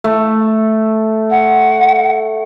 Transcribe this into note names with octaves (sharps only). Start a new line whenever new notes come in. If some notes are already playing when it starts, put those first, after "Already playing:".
A3
F#5